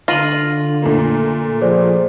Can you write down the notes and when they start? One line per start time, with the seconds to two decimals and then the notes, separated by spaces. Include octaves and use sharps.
0.08 D3 F4 A#6 D#7 F#7
0.82 A#2 A3 A#3
1.61 F3 G#4 C5 D5